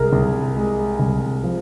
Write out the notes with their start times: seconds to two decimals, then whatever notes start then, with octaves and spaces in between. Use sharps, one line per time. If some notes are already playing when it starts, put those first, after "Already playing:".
Already playing: C2 G#3 G#4 A#4
0.13 C2
0.56 G#3
1.00 C2
1.44 F3